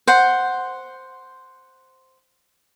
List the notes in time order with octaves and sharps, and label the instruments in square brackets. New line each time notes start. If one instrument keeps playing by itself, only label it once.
[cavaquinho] C5 F#5